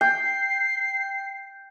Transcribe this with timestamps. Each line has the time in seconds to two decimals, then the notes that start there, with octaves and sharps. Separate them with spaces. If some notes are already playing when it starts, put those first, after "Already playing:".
0.01 G5 C7